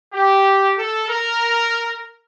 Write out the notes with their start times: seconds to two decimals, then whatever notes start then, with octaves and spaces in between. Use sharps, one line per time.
0.14 G4
0.77 A4
1.08 A#4